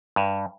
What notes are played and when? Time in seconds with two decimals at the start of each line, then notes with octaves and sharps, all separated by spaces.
0.16 G2